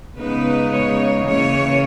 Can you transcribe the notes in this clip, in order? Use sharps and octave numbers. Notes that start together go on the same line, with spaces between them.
C#3 G#3 B3 D#4 B4
C#5
C#3 E3 A#3 C#5